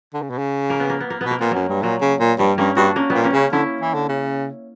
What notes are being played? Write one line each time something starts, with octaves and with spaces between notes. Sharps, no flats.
D3
C#3
B2
C#3
A#3
B3
A#3
B3
A#3
B2 B3
A#3
A#2 B3
F#2 F#3 A#3
G2
A#2 F#3
C#3
A#2
G2 G3
G2 A#3 C#4
G2 D4 F#4
A#3 C#4
A#2 G3 B3
A#3 C#4
C#3
D3 C#4 E4
E3
D3
C#3